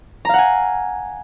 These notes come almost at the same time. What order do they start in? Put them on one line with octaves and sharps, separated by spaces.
A#5 F5 F#5 G#5